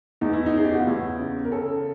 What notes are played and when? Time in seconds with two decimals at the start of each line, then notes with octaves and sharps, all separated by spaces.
0.21 E2 D#4
0.33 E4
0.46 D#4
0.54 C#3 G#4
0.65 G4
0.73 F#4
0.80 F4
0.87 E2 E4
1.19 C#3
1.45 A#4
1.51 C#3 A4